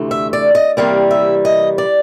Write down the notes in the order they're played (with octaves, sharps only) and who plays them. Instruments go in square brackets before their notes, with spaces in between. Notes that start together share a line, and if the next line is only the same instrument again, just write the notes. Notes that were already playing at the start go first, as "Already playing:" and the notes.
Already playing: [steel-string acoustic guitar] D2 C3 E3 A3
E5
D5
D#5
C3 E3 G3 A#3 F5
E5
D#5
D5